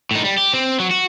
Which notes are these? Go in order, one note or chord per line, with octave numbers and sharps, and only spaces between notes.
A2 D#4
G3
G4
C4
F#3
F#4